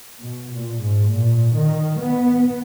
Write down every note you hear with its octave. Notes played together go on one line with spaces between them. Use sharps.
B2
A#2
G#2
A#2
D#3
B3